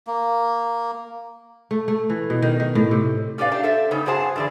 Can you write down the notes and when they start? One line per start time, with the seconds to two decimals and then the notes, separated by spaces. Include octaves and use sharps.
0.07 A#3
1.71 A3
1.88 A3
2.10 E3
2.30 B2
2.42 D#3
2.60 D#3
2.75 A2
2.91 C3
3.38 C#4 G4 B4 D5 F5
3.51 A3 D4 G4
3.63 A4 C5 E5
3.91 C#3 G3 B3 C#4 D#4
4.06 G2 C#3 F#4 G#4 C5 A5
4.36 G2 D3 E3 G#4 D5